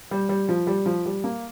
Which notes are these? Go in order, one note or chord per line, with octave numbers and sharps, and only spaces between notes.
G3
G3
F3
G3
F3
G3
A#3